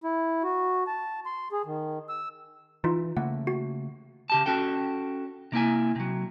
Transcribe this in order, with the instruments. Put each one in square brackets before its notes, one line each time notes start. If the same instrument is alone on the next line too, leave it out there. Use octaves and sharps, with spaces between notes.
[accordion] E4
F#4
A5
C6
G#4
D#3
E6
[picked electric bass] E3 [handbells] D#4 F4
[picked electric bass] C#3 A3 A#3 [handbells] F#5
[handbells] F#4
[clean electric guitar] C#3 G4 A5
C#4 F#4 A4 G5
C3 A#3 E4 G#5
C3 F#3